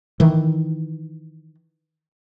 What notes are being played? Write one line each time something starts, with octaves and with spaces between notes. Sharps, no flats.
D#3 E3